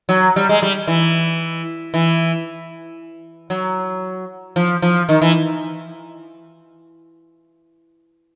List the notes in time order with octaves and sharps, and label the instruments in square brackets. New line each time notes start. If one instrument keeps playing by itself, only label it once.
[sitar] F#3
G3
G#3
G3
E3
E3
F#3
F3
F3
D#3
E3